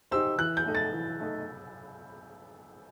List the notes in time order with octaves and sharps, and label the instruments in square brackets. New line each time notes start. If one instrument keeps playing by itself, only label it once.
[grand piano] D#4 G4 C5 [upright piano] E6
[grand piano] E3 [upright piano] F#6
[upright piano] G6
[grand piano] A3 D#4 A4 D#5
[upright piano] A6
[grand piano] E3
A3 D#4 A4 D#5